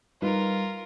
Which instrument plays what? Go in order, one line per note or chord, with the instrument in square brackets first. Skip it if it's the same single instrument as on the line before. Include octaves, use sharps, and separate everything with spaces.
[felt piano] G3 D#4 B4 [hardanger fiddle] F4 A#4